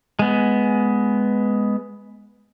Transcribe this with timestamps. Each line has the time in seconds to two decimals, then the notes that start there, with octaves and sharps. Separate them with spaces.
0.19 G#3 B3